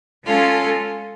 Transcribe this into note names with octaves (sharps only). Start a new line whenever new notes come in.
G#3 C#4 F4 A4